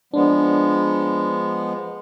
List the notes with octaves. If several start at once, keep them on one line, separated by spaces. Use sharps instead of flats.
F3 G#3 B3 D4